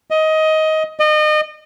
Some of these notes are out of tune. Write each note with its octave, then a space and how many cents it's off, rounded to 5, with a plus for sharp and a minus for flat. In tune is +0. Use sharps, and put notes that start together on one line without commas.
D#5 +15
D#5 -30